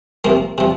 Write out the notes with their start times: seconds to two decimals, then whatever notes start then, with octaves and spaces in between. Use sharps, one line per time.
0.24 C3 F3 A#3
0.58 C3 F3